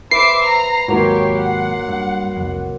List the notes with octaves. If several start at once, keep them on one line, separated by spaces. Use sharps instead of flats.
B4 C5 E5 D6 C7
A#5
D#2 G#2 F#3 A#3 F4 G4 C#5
F#5
G2
C2 F2